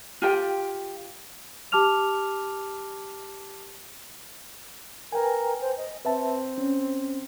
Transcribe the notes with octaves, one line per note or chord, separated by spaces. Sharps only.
F4 G4 G5
G4 A5 D6 F6 F7
A#4 B4 G5 G#5
C5
D#5
C4 B4 E5 A5
C#4